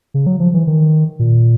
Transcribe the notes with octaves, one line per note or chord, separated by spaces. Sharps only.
C#3
F#3
F3
E3
D#3
A#2